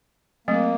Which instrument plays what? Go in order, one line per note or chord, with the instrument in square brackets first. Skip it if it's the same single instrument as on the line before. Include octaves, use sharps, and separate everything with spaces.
[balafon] F#3 A3 C4 [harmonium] A#3